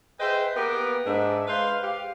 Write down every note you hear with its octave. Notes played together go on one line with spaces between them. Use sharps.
G#4 B4 C5 D#5 E5 G5
A#3 B3 G4 A#4 B4
G#2 D4 E5
G#3 B4 C5 F5
G4 F5